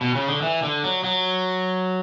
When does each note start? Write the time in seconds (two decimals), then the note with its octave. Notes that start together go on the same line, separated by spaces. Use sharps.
0.01 B2
0.15 C#3
0.29 D3
0.42 E3
0.63 D3
0.84 F#3
1.04 F#3